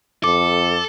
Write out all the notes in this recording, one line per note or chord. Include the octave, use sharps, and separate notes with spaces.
F2 A4 D6